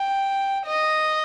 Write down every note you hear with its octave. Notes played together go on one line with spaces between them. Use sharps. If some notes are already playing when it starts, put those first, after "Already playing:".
Already playing: G5
D#5